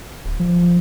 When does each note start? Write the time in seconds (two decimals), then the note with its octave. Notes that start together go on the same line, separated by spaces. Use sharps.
0.24 D1
0.39 F3